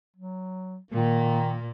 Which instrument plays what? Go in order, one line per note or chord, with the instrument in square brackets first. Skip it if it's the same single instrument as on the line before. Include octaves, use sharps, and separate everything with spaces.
[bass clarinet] F#3
[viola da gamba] A#2 A#3 [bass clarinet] D#3